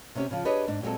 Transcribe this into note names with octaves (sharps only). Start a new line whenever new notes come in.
C3 C#4 G4
C#3 F3
D4 G4 G#4 B4 C#5 D#5
G#2 D4
A#2 F#3 G#3 C4 A4